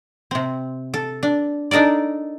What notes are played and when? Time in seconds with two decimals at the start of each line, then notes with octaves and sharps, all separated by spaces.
0.31 C3 C4
0.94 A4
1.23 D4
1.71 D4 D#4 A4 A#4 D5